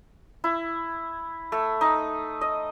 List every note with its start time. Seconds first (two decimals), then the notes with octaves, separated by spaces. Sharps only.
0.44 E4
1.52 A3
1.81 D#4
2.41 D#5